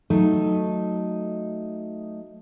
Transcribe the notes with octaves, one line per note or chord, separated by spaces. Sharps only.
F#3 A3 D#4